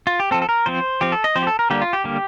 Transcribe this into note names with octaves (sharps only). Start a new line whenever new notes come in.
F4
G4
F3 C4 A4
A4
A#4
F3 C4 C5
F3 C4 G4
A4
D#5
F3 C4 C5
G4
A4
A#4
D3 G3 A#3 G4
F4
G4
D3 G3 A#3